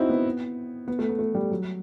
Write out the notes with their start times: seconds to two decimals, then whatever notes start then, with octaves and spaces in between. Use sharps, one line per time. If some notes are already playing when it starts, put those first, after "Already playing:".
Already playing: C4 D#4 E4 F#4
0.09 B3
0.88 B3
0.99 A3
1.09 B3
1.19 A3
1.35 G3
1.51 F#3